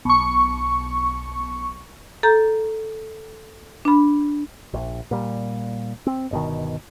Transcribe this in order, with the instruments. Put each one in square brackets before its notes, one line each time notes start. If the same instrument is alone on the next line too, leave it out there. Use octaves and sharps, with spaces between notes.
[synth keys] B1 C#6
[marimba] A4 A#5 G6
D4 B5
[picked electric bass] A#1
A#2 G3
C4
G1 B2 D#3